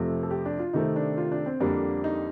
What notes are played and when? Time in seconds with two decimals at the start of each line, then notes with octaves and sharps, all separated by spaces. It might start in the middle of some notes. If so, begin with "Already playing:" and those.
Already playing: F2 C3 F3 A3
0.23 A4
0.31 G4
0.45 D4
0.59 F4
0.73 C3 D#3 A3 C4 D#4
0.96 D4
1.17 F4
1.32 D4
1.46 C4
1.60 F2 D3 G3 A#3 D4
2.04 D#4